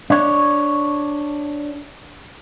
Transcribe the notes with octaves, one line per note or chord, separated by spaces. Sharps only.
D4 C#5